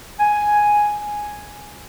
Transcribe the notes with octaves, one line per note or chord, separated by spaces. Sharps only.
G#5